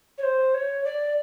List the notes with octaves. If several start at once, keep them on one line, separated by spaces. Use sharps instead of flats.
C#5
C5
C#5
D5